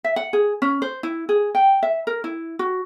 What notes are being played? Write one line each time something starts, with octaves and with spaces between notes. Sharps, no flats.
E5
F#5
G#4
C#4
C5
E4
G#4
G5
E5
A#4
E4
F#4